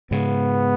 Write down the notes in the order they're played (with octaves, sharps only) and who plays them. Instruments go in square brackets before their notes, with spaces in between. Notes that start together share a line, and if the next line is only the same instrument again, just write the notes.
[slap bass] G#2 C#3 [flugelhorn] B3